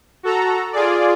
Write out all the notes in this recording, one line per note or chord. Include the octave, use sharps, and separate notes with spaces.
F#4 A4 A#5
F4 G#4 D5